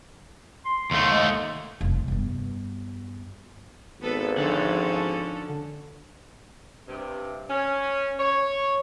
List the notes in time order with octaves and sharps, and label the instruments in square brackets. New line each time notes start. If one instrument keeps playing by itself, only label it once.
[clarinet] C6
[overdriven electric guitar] D#2 A3
[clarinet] G#3
[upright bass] F1 C2
G2 B3
[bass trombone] G#1 [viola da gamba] B3 A4 B4
[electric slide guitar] D3 [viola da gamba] F3 C#4 A4
[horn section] G2 C3
C#4
C#5